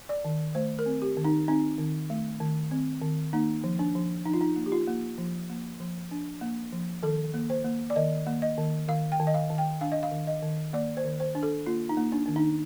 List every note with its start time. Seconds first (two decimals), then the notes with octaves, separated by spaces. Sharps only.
0.09 D5
0.25 D#3
0.55 A3 C5
0.79 A#4
0.86 C4
1.02 G4
1.17 D#3
1.25 D#4
1.48 C4 D#4
1.79 D#3
2.10 A3
2.40 D#3
2.71 C4
3.02 D#3
3.33 A#3 D#4
3.64 F3
3.79 D4
3.95 F3
4.26 F3 D#4
4.34 F4
4.41 D#4
4.56 A#3
4.66 G4
4.72 F4
4.88 A#3
5.18 F3
5.50 A#3
5.80 F3
6.11 D4
6.41 A#3
6.73 F3
7.03 D#3 A4
7.34 A#3
7.50 C5
7.65 A#3
7.90 D5
7.96 D#3 D#5
8.27 A#3
8.42 D#5
8.57 D#3
8.88 D#3 F5
9.12 G5
9.20 D#3
9.27 D#5
9.34 F5
9.50 D#3
9.58 G5
9.81 D4 F5
9.92 D#5
10.03 F5
10.12 D#3
10.27 D#5
10.43 D#3
10.73 A#3 D5
10.97 C5
11.05 D#3
11.20 C5
11.35 D4
11.43 A4
11.66 A#3 F4
11.89 D#4
11.97 A#3
12.12 D4
12.26 D#3 D4
12.36 D#4